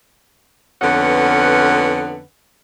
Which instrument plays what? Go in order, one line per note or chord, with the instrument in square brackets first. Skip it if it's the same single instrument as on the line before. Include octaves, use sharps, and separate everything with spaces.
[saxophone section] F2 D3 B3 C#4 B4 F#5